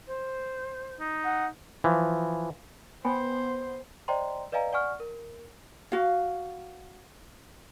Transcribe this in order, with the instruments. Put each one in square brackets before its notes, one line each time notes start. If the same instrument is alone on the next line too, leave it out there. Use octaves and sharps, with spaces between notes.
[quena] C5
[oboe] D#4
[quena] F#5
[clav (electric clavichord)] E3 F3
[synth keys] B3 [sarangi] C5 [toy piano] G5 G#5 B5
[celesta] C5 D5 D#5 G5 A#5 C6
B4 D5 D#5 F5 G#5 A#5
D5 F#5 G#5 C#6 F6
A#4
[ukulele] F#4 F5